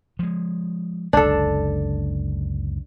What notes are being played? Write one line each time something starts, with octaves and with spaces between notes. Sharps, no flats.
F3 G#3
F#1 C#2 D3 D4 A4